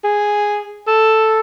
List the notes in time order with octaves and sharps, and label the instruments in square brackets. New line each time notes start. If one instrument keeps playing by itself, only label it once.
[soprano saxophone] G#4
A4